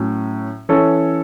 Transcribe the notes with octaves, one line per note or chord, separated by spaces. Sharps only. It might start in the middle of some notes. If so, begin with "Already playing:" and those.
Already playing: A2 F#3 C#4
E3 C#4 A4 C#5